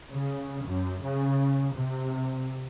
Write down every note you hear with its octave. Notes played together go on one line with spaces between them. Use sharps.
C#3
F#2
C#3
C3